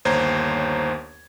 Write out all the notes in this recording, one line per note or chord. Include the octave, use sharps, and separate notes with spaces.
G1 D#2 C5 C#5 A#5 G#6